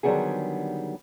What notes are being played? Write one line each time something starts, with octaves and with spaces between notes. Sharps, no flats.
D3 D#3 F#3 G3 B3 G#4